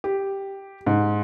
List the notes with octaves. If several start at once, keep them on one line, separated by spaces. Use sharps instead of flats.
G4
G#2